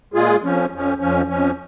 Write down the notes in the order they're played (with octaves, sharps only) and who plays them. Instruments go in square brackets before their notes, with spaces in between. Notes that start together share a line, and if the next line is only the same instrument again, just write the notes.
[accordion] A#2 G#3 F4 G#4
F2 F3 C#4
F2 F3 C#4
F2 F3 C#4
F2 F3 C#4